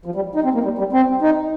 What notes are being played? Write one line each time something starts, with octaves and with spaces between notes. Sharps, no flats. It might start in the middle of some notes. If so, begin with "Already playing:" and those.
F3
G3
D#4
C4
A#3
G3
G3
C4
D#4